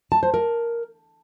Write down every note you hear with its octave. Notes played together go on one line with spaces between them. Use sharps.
A5
C5
A#4